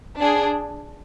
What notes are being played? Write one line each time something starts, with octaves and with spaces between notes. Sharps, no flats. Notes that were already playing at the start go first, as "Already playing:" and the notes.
D4 G#4